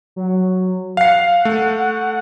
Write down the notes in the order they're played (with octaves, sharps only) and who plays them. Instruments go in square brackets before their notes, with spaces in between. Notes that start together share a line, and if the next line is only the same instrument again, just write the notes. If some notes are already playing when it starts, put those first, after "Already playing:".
[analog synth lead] F#3
[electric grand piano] F5 C7 [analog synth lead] F#5
[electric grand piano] A3